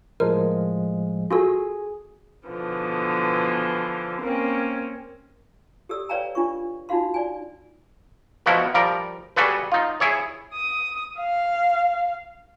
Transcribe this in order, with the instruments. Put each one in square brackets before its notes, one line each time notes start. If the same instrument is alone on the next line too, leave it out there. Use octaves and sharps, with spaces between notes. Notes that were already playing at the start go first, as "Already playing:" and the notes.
[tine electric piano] A2 F3 G#3 [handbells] A#4
[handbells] F4 F#4 A4 [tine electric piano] G#4
[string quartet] B2 D3 E3 F3
A#3 C4 C#4
[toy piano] G4 A4 D5 E6
B4 C#5 D5 F5 G5 A#5
D4 F4 C#6
D4 D#4 F4 F#4 F5 C6
D5 G#5
[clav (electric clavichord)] B2 F3 E4 F#4 A#4
F3 G3 A#4
G3 F#4 G#4 A4 B4
D#4 F4
E4 G#4 C#5
[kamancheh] D#6
F5